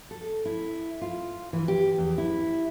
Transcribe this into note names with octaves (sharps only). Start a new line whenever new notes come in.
A4
E4
F4
E3
G4
E2
E4